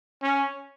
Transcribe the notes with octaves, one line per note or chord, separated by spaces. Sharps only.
C#4